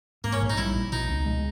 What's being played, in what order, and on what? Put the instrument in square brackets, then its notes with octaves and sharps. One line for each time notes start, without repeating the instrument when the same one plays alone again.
[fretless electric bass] G#2 [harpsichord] A#3
[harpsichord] C#4
[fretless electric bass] A#1
[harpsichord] D#4
[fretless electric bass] G3 [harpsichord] E4
[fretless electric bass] A#1
[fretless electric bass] B2 [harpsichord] D#4
[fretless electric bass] C#2
G#3